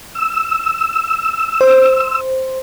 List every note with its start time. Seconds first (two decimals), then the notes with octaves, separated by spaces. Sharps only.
0.15 E6
1.61 C5